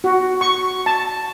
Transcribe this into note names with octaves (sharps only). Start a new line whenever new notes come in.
F#4
C#6
A5